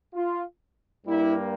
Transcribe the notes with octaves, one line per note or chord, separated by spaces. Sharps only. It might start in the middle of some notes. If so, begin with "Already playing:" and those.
F4
G2 G3 A#3 E4